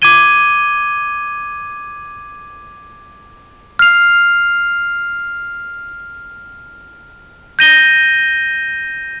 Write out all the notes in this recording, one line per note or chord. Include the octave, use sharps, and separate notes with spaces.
D6 G#6 D#7 G7
F6 C7 F7
G6 A#6 D#7 G7